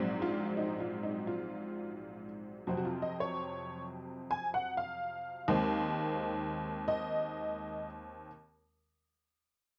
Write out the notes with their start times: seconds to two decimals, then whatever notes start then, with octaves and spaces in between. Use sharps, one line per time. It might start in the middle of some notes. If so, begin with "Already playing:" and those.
Already playing: A#1 G#2 F#3 C4
0.22 F4
0.57 D#4
0.80 F4
1.03 D#4
1.27 F4
2.67 F2 C3 F#3 C4 F#4
2.77 F#4
2.85 F4
3.02 D#5
3.20 C#5
4.31 G#5
4.54 F#5
4.77 F5
5.48 D#2 D#3 G#3 C4
6.88 D#5